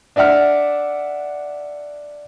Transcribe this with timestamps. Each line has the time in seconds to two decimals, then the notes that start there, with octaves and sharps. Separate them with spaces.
0.16 D4 D5 E5 F#5 F6